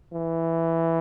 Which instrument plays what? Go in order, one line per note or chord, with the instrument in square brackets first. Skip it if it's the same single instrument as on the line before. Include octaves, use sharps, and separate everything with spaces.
[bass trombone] E3